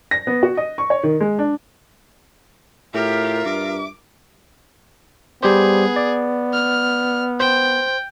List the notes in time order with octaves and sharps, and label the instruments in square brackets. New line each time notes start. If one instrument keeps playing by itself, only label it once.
[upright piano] A#6
B3
F#4
D#5
C#6
C#5
D#3
G#3
D4
[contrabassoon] A2 [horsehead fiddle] F4 A#4 [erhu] G4 [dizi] E5
[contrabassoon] G2 [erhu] D6
[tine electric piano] G3 G4 C5 [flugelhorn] B3 [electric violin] G#4
[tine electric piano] D5
[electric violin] F6
[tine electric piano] C5 [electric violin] G5